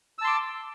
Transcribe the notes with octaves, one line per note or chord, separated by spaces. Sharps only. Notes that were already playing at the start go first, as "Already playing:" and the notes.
A5 C6 D6 E6